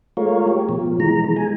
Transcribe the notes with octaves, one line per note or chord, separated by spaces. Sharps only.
G#3 A3 F4 A#4 C#5
G4
B2 F3
E3 G#3 A#5
G#3 G#5